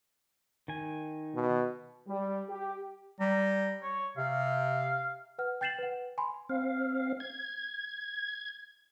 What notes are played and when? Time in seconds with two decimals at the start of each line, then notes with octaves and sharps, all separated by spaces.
0.68 D#3 G#5
1.35 B2
2.08 G3
2.48 G4
3.20 G3 A#5
3.82 C#5
4.18 C3 F5
5.39 B4 F#5 F6
5.61 G5 G6 A6 C7 E7 F#7
5.79 B4 F#5
6.18 G#5 B5 C6
6.49 C4 F5
7.20 G#6